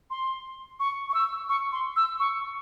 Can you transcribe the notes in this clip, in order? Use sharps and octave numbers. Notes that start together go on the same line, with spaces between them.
C6
C#6
C#6
E6
C#6
C6
E6
C#6